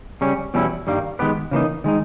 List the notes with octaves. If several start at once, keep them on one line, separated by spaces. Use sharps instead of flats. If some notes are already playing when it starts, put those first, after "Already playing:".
C#3 G3 C#4
E2 B2 G3 C#4 E4
G2 D#3 G3 A#3
D#3 G#3 B3 G4 B4
C#3 E3 A#3 D#4
D#3 G#3 D#4